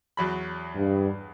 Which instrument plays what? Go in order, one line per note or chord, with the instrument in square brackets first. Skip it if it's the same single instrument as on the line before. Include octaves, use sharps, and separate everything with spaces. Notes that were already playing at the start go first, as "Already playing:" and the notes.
[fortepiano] E2 F#3 B5
[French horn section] G2